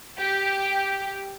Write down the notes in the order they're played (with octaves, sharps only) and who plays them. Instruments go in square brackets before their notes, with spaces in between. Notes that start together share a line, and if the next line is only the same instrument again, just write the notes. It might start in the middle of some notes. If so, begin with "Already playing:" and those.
[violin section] G4